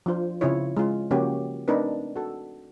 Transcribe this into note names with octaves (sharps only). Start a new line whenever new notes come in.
F3 D4 F4 C5
C#3 C4 E4 F4 C#5
G#3 C#4 F4
C#3 F3 A#3 C#4 F#4 G4
A3 C4 D4 D#4 A#4 B4
F#4 A4